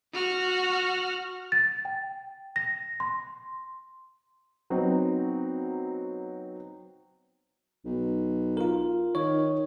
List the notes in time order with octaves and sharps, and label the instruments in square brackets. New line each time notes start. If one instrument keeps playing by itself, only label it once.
[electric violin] F#4 F6
[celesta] A6
G5
A#6
C6
[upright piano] F#3 B3 C4 D#4
[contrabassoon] B1
[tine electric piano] F4 A#4
[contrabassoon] D#3 [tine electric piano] C#5